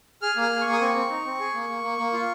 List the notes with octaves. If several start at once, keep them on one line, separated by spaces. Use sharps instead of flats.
G#4 F6
A#3 F6
G#4
A#3 C#6
D#6
C4 C#6
C4
D#4
C4
G#4
A#3
A#3
A#3
A#3
F4